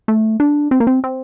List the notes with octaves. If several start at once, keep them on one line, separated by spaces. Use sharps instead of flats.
A3
D4
C4
A#3
C4
C4